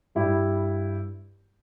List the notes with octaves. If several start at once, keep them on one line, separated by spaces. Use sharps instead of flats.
G2 G3 E4 G4